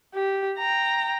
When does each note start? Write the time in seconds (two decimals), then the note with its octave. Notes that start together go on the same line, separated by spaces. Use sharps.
0.14 G4
0.58 G5 A#5